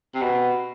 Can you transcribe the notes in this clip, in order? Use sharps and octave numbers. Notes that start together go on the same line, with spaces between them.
C3
B2